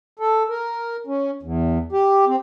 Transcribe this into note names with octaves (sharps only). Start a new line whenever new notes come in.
A4
A#4
C#4
E2
G4
C4